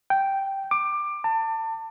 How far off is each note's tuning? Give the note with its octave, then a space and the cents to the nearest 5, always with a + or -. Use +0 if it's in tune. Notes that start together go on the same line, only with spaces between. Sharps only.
G5 -5
D6 +20
A5 +30